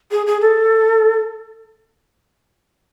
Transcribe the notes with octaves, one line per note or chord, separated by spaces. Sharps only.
G#4
G#4
A4